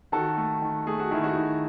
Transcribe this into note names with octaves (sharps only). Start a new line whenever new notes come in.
D#3 F#4 A4
A3
D#3
A3 G#4
F#4
D#3 E4 G#4
D#4 F#4
D#3